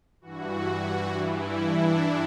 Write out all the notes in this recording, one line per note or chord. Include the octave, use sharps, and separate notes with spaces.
G2 E3 F#4
G2 E3 E4
D4